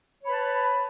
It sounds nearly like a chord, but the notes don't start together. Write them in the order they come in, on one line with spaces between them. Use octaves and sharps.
C#5 B5 B4 A5